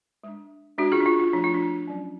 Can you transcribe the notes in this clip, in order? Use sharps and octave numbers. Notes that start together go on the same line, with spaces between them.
G#3 D4
G#3 C#4 D4 F#4
F4 G#4
D4
F4
F4
F3 A3 D4
F4
D4
F#3 C#4